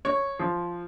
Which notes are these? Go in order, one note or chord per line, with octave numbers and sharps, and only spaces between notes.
C#5
F3